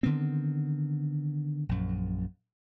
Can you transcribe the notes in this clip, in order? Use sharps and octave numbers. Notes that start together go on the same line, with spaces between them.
D3 D#3 B3 C4
A#1 F#2